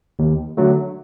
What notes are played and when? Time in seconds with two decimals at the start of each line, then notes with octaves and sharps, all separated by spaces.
0.19 D#2
0.57 D3 F#3 A3